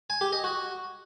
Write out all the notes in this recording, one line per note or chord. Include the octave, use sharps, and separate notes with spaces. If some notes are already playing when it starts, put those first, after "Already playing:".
G#5
G4
D#5
F#4